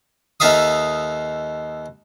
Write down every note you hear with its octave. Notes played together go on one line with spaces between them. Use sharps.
D#2 D#4 A4 E5 F5 D#6